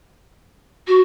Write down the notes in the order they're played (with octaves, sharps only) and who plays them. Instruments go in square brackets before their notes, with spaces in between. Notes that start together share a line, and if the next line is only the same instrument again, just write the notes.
[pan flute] F#4